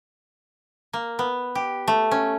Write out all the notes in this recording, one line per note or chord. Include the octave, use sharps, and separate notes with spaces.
A#3
B3
G4
A3
C#4